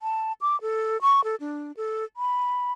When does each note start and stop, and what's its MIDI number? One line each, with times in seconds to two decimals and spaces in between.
0.01 0.32 81
0.41 0.60 86
0.61 0.98 69
1.02 1.21 85
1.24 1.36 69
1.40 1.72 62
1.77 2.05 69
2.17 2.72 83